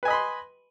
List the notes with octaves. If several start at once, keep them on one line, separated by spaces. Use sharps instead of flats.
B4 D#5 G#5 B5 C6